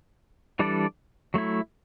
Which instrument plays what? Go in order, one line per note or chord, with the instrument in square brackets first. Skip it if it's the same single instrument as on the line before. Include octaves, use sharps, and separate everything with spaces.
[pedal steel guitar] E3 G3 D4 A4 D5
F#3 A3 E4